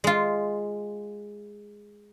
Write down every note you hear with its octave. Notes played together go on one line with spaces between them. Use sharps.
G#3 F4